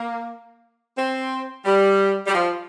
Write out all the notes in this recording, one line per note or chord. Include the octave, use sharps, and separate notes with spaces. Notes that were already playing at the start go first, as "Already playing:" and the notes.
Already playing: A#3
C4
G3
G3
F3